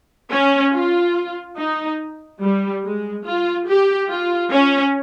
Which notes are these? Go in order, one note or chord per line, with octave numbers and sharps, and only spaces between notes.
C#4
F4
D#4
G3
G#3
F4
G4
F4
C#4